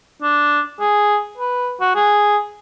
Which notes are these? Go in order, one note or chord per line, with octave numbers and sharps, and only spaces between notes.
D4
G#4
B4
F#4
G#4